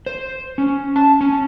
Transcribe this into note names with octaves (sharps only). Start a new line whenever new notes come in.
C5
C#4
A5
C#4